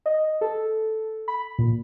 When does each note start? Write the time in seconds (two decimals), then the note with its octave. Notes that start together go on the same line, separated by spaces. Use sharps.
0.06 D#5
0.41 A4
1.28 B5
1.58 A#2